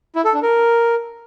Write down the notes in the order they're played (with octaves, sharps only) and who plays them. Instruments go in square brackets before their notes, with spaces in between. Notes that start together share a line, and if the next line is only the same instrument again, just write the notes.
[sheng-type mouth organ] E4
A4
D4
A#4